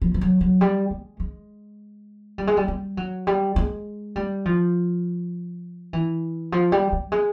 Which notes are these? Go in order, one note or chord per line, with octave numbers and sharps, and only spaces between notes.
F3
F3
F#3
F#3
G3
G#3
G#3
G3
G#3
G3
G3
F#3
G3
G#3
G3
F3
E3
F3
G3
G3
G#3